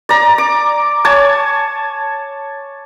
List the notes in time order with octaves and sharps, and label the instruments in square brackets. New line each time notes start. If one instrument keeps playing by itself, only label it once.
[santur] D5 A#5
D6
C#5 G#5 A5